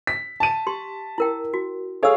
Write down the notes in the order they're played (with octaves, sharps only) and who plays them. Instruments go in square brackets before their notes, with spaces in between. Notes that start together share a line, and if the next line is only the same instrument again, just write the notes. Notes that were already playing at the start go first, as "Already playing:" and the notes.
[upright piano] B6
A5 D#7
[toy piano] G4 C6
E4 A#4 G5
F#4
[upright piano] G#4 C#5 F5 [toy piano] A4 E6